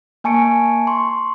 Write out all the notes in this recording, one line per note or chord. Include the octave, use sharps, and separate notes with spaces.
A#3 G#5 A5 C#6 C#7 D7
C6 C#6